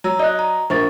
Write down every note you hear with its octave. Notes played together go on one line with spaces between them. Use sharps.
F#3 A#5 E6
D5 D#5 F#6
A#5
A#1 A#3 C5 C#6 A6